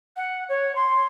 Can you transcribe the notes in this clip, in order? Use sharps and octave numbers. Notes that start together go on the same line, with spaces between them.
F#5
C#5
C6